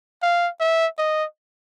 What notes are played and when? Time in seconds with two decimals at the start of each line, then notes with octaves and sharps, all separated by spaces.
0.23 F5
0.60 E5
0.98 D#5